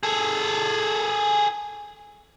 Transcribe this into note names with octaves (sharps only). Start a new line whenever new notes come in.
G#4 A4